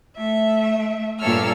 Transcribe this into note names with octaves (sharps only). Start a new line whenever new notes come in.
A3 E5
G2 A#2 A4 C#5 E6 F6